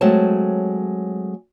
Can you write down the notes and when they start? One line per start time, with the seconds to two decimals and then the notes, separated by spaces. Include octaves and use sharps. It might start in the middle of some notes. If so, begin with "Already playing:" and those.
0.01 F#3 G#3 A3 C4 C#5 A5